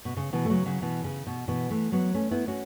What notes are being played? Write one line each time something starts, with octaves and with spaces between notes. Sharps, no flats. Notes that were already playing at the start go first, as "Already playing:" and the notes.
B2
C#3
B2 E3
A3
C#3 F#3
C#3 F#3
B2 E3
C#3
B2
B2 E3
E3 A3
F#3 B3
A3 C#4
B3 E4
C#4 F#4